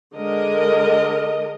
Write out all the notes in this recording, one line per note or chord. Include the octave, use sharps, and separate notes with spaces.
D3 G#3 A#4 D#5